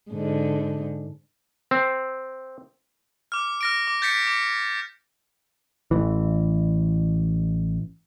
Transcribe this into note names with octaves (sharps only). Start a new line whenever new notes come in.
G#2 D3
C4
D6 F6
F6 A#6 D7
D6
G6 A6 B6 C#7
D6 C#7
A1 E3